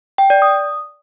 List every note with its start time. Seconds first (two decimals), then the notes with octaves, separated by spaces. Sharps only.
0.18 G5
0.30 D5
0.42 D#6